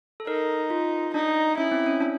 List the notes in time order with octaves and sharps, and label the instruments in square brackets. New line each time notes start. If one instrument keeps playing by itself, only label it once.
[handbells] A4
[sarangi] D#4 [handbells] A#4
[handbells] F4
[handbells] D4 [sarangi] D#4
[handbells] C#4 [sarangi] E4
[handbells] C4
C#4
D4